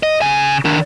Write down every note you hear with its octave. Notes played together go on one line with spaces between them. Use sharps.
D#5
C#3 G#5
D#3 D4